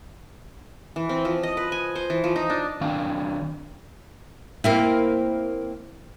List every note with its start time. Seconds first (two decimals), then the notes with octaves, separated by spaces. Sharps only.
0.96 E3
1.09 C4
1.25 F3
1.43 D#5
1.57 B4
1.72 G#5
1.95 C5
2.10 E3
2.24 F3
2.36 D#4
2.50 D4
2.81 D#3 C4 D4 F5
4.64 A#3 C4 E4